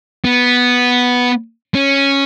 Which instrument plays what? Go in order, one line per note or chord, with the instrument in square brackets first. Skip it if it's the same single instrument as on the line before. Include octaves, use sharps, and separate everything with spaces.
[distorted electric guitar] B3
C#4